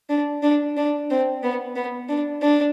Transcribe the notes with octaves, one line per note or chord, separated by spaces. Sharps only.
D4
D4
D4
C4
B3
B3
D4
D4